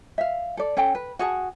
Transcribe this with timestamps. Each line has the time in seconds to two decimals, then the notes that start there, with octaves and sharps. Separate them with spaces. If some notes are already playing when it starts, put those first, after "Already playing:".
0.18 E5 F5
0.57 A4 D5
0.77 C#4 A4 G5
0.95 B4
1.19 F#4 G#4 F#5 A5